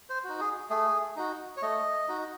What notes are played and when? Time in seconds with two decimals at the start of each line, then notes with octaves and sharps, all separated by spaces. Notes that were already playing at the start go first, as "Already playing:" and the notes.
0.09 C5
0.24 D#4 F#4
0.40 G#4
0.70 A3 G#4
1.16 D#4 F#4
1.57 C#5
1.62 A3 D#5
2.08 D#4 F#4